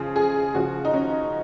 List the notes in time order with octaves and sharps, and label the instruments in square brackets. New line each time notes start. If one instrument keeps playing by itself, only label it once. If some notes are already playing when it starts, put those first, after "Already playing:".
Already playing: [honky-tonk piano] C#3 F3 G#4
G#4
C#3 F3 F#4
D#4
C#4